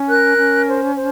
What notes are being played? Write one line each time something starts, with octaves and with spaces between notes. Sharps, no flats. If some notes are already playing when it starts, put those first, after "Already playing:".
Already playing: C#4
A#4 F#6
C#4
C5
C5